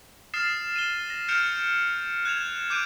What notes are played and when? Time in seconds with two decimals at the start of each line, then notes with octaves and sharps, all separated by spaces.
0.34 D#6 F6 A6 C7 E7
0.76 D#7 G7
1.10 A#6
1.28 F6 G6 C#7 D7 E7 F7
2.25 F#6 G#6 E7 F7
2.70 D6 F#6 G6 D7 D#7